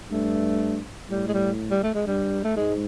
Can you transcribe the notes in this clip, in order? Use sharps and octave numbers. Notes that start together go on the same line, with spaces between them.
G2 A3
A2 G3
G#3
G3
G3
A3
G#3
G2 G3
A3
G#2 G#3